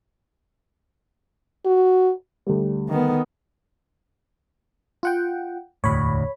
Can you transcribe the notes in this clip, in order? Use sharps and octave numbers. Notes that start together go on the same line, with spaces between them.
F#4
D2 G3
D#3 B3
F4 F#5 G5
E1 D2 A2 C#5 B5